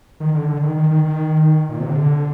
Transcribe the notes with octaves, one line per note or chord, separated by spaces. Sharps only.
D#3
D3
D3
D#3
D#3
D#3
D#3
A#2
C3
D3